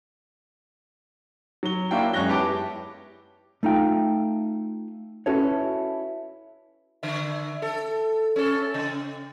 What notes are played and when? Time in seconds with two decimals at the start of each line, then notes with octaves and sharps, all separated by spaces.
1.63 F#3 G7
1.91 A#3 D4 E4 F#4 C#5 G5
2.13 F#2 G#3 C#5 F#6 A#6 G7
2.28 B3 E4 G4 A5 D6 D7
3.63 A3 D#4 F4 G5
5.26 C#4 E4 F#4 A4 B4 C#5
7.03 D3 E5
7.62 A4
8.36 C#4 A4
8.74 C#3